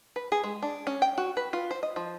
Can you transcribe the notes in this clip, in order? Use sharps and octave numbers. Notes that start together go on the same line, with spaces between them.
B4
G#4
G#3
D4
C#4
G5
F#4
B4
F4
C5
D#5
F3